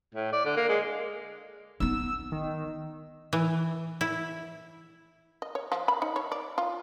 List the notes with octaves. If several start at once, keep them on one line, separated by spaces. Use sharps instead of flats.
A2
D5
D3
A#3
G#3
B3 D#4 E6
D#3
E3
E4
D#5
C#5
F3
B5
D#4
C#5
D5
F4